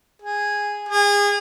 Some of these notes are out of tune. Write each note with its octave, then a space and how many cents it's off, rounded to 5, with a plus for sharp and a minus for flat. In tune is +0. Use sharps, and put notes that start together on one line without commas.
G#4 -10
G#4 -30